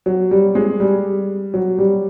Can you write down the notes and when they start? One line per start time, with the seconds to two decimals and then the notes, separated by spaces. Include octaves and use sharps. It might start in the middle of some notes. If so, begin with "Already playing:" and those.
0.06 F#3
0.31 G3
0.55 G#3
0.80 G3
1.54 F#3
1.78 G3